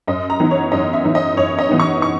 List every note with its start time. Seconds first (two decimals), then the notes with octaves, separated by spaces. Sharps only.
0.07 F#2 D#5
0.30 A#5
0.40 E3 B3 D#4
0.51 C#5
0.72 F#2 D#5
0.93 E5
1.05 E3 B3 D#4
1.15 D#5
1.37 F#2 C#5
1.59 D#5
1.69 E3 B3 D#4
1.80 C#6
2.02 C#6